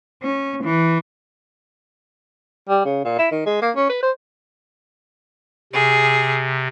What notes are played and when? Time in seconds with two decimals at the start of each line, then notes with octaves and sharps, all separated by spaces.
0.23 C#4
0.63 E3
2.69 G3
2.85 C#3
3.05 A#2
3.19 E4
3.31 D#3
3.46 G#3
3.62 A#3
3.76 C#4
3.89 B4
4.03 C5
5.73 C3 G#4